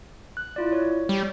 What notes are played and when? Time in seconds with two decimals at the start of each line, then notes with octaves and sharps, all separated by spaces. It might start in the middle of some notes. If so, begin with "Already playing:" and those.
0.37 F#6
0.56 E4 F4 D5
0.72 C#5
1.09 G3